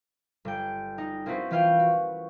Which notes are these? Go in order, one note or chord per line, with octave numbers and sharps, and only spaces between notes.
G1 G5
D#4
A#3 C4 C#4 E4 F#4 B4
E3 C#4 F4 F5 G5 G6
F#4